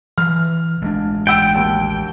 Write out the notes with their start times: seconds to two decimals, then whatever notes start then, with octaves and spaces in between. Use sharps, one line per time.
0.18 E3 F6
0.82 A1 G#3 D4
1.27 F#5 G5 E6 D7
1.55 D#2